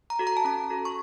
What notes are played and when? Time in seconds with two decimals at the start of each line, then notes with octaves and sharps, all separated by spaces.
0.10 A#5
0.19 F#4 A4
0.27 A#5
0.37 A5
0.45 C#4 A#5
0.70 F#4 A4
0.85 C#6